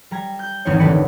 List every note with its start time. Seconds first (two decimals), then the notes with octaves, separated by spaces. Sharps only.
0.11 G3 A#5 G#6
0.39 G6
0.65 G#1 E2 D#3 C4 C#5
0.80 F1 D3 D5 B5 C#7